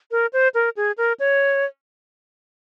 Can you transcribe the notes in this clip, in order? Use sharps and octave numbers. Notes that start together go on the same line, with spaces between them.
A#4
C5
A#4
G#4
A#4
C#5